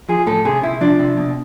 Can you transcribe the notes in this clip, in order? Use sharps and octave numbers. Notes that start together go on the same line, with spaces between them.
F3 G#4
A2 A4
C3 G#4
C3 E4
F3 D4
C3
B2